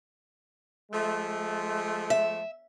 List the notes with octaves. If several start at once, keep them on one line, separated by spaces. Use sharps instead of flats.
F3 G#3 A3
E5